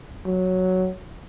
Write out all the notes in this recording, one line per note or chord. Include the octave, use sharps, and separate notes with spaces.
F#3